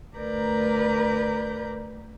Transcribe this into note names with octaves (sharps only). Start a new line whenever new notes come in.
D2 A#4 B4 D5 A#5 G6